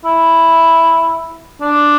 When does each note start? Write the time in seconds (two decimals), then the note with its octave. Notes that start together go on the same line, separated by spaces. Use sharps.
0.05 E4
1.61 D4